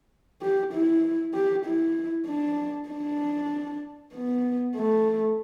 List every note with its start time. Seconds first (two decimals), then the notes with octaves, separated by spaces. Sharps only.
0.42 G4
0.73 E4
1.34 G4
1.66 E4
2.27 D4
2.89 D4
4.13 B3
4.75 A3